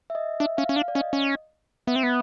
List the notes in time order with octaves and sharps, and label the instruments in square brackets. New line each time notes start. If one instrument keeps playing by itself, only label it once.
[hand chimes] E5
D#5
[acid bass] D4 [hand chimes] E5
[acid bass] C#4 [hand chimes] F5
[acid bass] C#4
[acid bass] D4 [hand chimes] F5
[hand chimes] D5
[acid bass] C#4 [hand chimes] D#5
[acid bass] C#4
[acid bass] B3 [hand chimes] E5
[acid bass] C4
B3